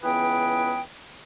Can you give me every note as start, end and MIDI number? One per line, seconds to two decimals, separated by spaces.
0.04 0.80 37
0.04 0.80 52
0.04 0.80 59
0.04 0.80 68
0.04 0.80 71
0.04 0.80 79